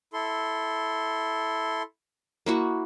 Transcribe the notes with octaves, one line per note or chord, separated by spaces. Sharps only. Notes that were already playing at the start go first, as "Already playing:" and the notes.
E4 A4 C6
A#3 E4 F#4